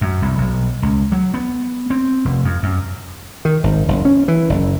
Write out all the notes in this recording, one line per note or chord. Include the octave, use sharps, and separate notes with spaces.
F#2
C2
B1
C#2
F#3
B3
C4
F1
F2
F#2
D#3
G#1
F#1
C#4
E3
F#1